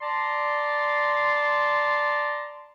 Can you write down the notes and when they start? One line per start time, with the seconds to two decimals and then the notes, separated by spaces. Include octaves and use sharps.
0.01 D5 A5 A#5 C6